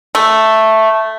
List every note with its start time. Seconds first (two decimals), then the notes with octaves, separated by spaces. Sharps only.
0.15 A3